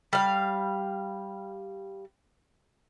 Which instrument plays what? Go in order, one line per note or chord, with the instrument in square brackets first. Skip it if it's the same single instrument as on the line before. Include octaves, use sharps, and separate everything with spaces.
[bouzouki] G3 F5